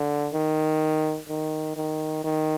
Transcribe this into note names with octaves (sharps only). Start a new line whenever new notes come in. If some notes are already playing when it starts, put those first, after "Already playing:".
Already playing: D3
D#3
D#3
D#3
D#3